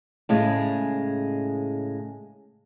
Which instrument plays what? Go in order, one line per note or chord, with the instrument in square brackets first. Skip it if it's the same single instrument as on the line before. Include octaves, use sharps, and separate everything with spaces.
[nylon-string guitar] A2 C#3 G#3